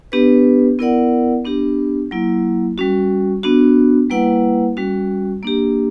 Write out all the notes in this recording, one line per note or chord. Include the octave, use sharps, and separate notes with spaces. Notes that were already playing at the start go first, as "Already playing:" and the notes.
B3 D4 G4 B4
B3 E4 A#4 D5 F#5
B3 D4 G4
F#3 A#3 E4
G3 C#4 F#4
B3 D4 F#4
G3 A#3 E4 B4 F#5
G3 C#4 F#4
A#3 D4 G4